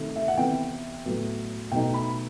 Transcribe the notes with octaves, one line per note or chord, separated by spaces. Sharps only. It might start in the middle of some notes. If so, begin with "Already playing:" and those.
Already playing: C3 D#3 A3
E5
F#5
C3 E3 B3 E4 G5
A2 F#3 B3
B2 F#3 A3 D#4 G5
B5